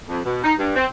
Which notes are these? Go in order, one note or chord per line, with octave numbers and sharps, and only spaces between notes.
F2
B2
D#4
G2
C4